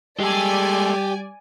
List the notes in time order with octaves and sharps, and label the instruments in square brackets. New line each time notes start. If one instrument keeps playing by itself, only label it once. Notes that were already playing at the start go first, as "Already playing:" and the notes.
[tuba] G3 [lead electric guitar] G#3 A4 [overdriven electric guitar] G4 [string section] D5 G#5